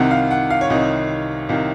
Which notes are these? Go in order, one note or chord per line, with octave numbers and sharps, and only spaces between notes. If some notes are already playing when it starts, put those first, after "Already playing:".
Already playing: C2 C3 D#3 F#5
F5
F#5
F5
C#5
C2 C3 D#3 D#5
C2 C3 D#3 F5